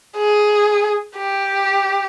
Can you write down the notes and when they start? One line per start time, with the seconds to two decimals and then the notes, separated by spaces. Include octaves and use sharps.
0.17 G#4
1.17 G4